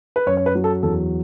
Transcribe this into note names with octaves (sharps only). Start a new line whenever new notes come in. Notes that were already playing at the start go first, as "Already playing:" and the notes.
B4
F#2 C#5
C#5
B4
F#3
A4
E2 A4